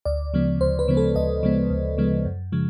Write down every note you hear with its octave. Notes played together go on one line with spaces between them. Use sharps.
D2 D5
C#3 F3 G#3 B3
D2 C5
B4
C#3 F3 G#3 B3
A4
D2 D#5
C#3 F3 G#3 B3
D2
C#3 F3 G#3 B3
F#2
C#3 F3 G#3